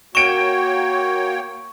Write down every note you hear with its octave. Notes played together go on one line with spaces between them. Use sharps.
A#3 F#4 C#5 G5 C#6 D7 E7